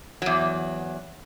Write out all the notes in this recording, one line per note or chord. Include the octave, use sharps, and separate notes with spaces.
E2 F#3